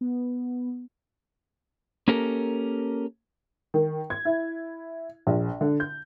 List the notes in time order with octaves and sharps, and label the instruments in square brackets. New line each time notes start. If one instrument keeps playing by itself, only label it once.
[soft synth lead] B3
[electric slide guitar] A#3 C#4 G4 A4 A#4
[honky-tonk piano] D#3
G#6
E4
A#1
D3
G6